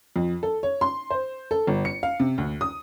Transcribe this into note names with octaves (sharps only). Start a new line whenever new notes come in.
F2
A4
C#5
C6
C5
A4
G1
C#7
F5
C3
D2
D#6